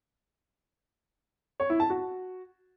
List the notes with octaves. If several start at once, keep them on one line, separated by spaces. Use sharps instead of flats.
C#5
E4
A5
F#4